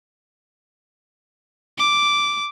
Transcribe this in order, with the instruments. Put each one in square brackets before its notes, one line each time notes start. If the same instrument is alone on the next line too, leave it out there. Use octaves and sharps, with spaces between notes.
[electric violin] D6